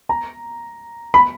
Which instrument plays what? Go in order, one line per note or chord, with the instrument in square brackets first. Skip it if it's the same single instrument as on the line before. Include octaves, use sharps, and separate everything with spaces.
[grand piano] A#5
B5